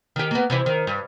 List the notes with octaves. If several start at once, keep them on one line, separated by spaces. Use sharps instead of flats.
D#3 G4
A#3 B3
C3 E3 E4
D#3
G2